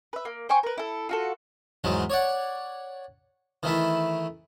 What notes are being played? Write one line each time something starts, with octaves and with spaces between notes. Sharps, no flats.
B4 E5
A#3
C5 G5 G#5 C#6
A#4 B4
E4 A4
F4 F#4 A4
E2 G#2 D#3 F#3 G#3
C#5 D5 F#5
D#3 E3 A3 E4